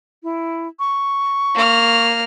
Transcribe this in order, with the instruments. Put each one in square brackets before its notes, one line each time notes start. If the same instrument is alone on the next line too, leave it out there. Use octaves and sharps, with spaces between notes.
[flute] E4
C#6
[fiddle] A#3 F6